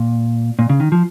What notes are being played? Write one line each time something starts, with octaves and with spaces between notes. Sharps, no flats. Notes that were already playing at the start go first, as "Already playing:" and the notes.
Already playing: A#2
A#2
C#3
D#3
F3